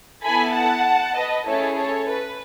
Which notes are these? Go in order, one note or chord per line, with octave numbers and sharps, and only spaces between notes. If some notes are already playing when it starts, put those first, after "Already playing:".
B3 E4 A4 G#5 B5
F#5 A5
B4 D#5
A3 C#4 E4 G#4 A4 C#5
A4 C#5
B4